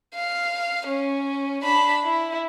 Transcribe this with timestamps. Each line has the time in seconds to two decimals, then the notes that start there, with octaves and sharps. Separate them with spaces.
0.15 F5
0.87 C#4
1.63 D4 B5
2.04 E4